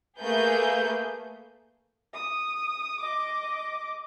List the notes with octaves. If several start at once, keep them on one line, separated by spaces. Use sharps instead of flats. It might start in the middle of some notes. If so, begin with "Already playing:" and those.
A3 A#3 G#4 B4 G6
D#6
D#5 D6